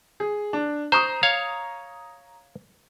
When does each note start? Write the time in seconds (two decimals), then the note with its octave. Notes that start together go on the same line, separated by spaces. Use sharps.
0.20 G#4
0.53 D4
0.92 C5 A#5 C#6 D#6
1.23 C#5 F5